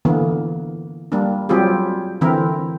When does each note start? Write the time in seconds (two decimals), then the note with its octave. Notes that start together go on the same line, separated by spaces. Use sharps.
0.05 D3 E3 A#3 B3
1.12 G3 A#3 D4
1.49 F#3 G3 C4 F4 G4 G#4
2.21 D3 E3 C4 E4 A#4